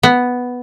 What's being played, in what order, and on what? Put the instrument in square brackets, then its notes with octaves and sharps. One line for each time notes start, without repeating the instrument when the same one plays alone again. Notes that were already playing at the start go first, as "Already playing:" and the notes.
[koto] B3